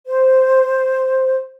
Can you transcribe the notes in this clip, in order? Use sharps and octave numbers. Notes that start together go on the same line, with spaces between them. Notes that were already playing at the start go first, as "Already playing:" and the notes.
C5